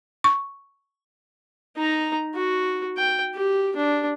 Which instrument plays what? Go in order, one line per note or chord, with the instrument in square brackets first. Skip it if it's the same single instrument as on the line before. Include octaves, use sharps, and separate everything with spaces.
[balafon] C#6
[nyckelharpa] D#4 A#5
F#4
G5
G4
D4